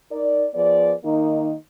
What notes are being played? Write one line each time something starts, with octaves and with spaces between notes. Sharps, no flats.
D#4 A#4 D5
F3 B3 G#4 D5
D#3 A#3 D#4